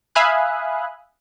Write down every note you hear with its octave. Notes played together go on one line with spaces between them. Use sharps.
E5 F5 G#5 B5 D#6 F#6